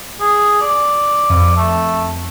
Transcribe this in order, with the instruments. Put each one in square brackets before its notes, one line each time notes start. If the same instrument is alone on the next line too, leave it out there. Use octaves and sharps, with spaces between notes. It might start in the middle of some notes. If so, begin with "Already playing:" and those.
[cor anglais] G#4
D5
[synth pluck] F2
[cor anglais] A3